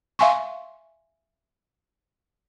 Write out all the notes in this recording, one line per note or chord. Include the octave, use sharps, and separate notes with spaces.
E5 F5 G#5 C6 C#6